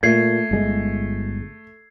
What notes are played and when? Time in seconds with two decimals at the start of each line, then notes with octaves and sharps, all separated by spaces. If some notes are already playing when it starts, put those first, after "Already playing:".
0.03 A#2 A3 G#6 C7
0.51 G1 G#3